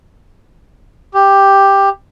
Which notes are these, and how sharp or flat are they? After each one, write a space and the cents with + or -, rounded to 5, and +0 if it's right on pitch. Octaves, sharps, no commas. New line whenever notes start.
G4 +5